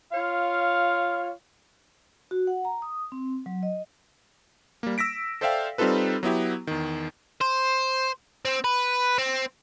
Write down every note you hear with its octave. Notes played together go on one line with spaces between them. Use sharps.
F4 C#5 F5
F#4
F#5
A#5
D#6
C4
F#3
D#5
G3 A#3
E6 A#6 B6 D7
A4 C5 D5 E5 F5 G5
G3 C4 D#4 F4 A4 B4
F#3 B3 E4 G4
E2 D#3
C5
C4
B4
C4